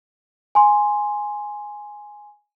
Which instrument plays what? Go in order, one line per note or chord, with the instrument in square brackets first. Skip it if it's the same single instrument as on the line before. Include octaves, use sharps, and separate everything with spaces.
[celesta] G#5 C6